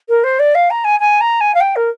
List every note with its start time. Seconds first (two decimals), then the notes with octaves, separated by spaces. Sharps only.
0.09 A#4
0.24 C5
0.39 D5
0.55 F5
0.70 A#5
0.84 G#5
1.00 G#5
1.21 A#5
1.40 G#5
1.54 F5
1.60 G5
1.76 A#4